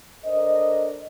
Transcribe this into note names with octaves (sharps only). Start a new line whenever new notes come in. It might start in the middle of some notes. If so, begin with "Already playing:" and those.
D4 A4 A#4 C5 D#5